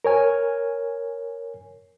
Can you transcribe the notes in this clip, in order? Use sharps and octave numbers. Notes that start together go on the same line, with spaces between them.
A#4 C#5 G#5